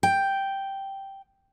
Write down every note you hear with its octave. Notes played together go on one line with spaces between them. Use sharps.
G5